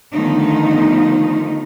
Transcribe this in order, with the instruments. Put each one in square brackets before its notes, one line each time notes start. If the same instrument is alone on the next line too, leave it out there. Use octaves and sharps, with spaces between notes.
[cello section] D3 D#3 F3 A3 B3 D#4